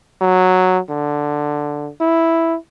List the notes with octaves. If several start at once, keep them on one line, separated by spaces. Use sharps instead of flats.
F#3
D3
E4